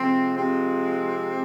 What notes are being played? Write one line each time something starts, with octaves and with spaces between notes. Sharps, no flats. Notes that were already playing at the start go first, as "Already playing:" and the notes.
Already playing: C3 F3 G#3 C4
C3 C4